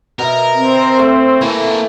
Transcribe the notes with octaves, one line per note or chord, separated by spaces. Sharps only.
B2 A#4 E5
C4
A3
E3 A#3 A4